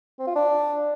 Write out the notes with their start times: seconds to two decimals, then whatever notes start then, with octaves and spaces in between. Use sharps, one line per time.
0.19 C4
0.27 F4
0.36 D4